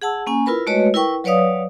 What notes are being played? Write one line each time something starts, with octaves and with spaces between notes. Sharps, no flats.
G#4 F#5 A5 E6
A#3 C#4 G#5
E4 F4 A#4 B4 B5
G#3 A3 F#4 B4 C#5 D#5
E4 A#4 B4 G5 C#6 E6
F#3 B4 C#5 D5 F5 D#6